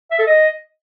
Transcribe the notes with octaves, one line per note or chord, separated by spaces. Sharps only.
E5
A4
D#5